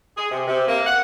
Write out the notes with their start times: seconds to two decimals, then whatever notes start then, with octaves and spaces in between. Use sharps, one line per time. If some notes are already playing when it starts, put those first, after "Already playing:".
0.17 G#4
0.31 C3
0.48 C3
0.68 A#3
0.86 F#5